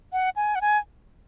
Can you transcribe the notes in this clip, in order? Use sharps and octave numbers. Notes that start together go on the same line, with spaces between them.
F#5
G#5
F#5
G#5